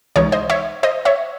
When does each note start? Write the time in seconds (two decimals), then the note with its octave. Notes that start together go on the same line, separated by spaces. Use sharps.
0.16 C#2 C3 E3 G#3 D#4 C#5
0.32 C5 D#5
0.50 C#5 E5
0.83 C5 D#5
1.05 C#5 E5